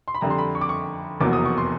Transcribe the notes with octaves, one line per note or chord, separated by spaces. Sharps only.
C6
B5
F2 D3 G3 A#5
C6
B5
C#6
D6
C#6
F1 E2 B2 F#3 A#3 D6
D#6
C#6
C6